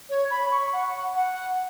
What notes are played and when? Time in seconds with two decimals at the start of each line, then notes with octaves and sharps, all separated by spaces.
0.10 C#5
0.30 B5
0.52 C#6
0.73 F#5
1.16 F#5